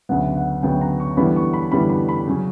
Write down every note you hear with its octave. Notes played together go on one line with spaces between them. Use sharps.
D2 C#3 F#3 B3 F#5
F#5
D2 C#3 F#3 B3 G5
A#5
C#6
E2 D3 G3 B3 E4 B5
C#6
B5
E2 D3 G3 B3 E4 B5
B5
B5
C#3 F#3 C#4